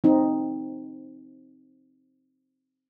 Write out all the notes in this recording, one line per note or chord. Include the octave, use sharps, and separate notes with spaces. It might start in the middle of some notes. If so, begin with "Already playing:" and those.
C4 D#4